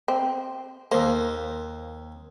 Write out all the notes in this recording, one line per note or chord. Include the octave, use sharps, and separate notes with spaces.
C4
D#2 A#3 C5